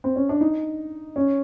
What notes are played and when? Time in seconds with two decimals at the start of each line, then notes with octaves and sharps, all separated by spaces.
0.04 C4
0.16 C#4
0.29 D4
0.41 D#4
1.16 C#4